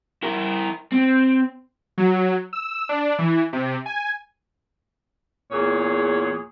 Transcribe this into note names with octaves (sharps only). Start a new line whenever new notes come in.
E4 A#4
C4
F#3
E6
D4
E3
C3
G#5
E2 A#2 G#4 C#5